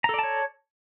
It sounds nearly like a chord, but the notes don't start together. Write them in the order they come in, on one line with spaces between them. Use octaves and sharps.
A#5 A4 D5 A5 C#5